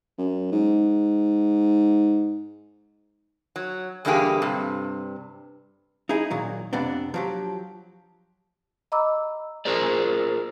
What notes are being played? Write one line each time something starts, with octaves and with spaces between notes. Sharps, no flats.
F#2
G#2
F#3
E2 G2 D3 A#3 G4 G#4
G2 C3
D#4 E4 G#4
A#2 D#3 F#3
F2 C3 B3 D4
F3 F#3 G4
D#5 A#5 B5 D6 E6
F4 G#4 A#4 C5 D5